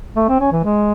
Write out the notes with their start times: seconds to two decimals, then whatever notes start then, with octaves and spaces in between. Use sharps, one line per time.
0.16 A3
0.28 C4
0.40 C#4
0.52 E3
0.64 G#3